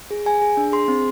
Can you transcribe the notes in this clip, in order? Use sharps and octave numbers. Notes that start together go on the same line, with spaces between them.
G#4
G#4 G#5
G#4
D4
G#4 C6
C4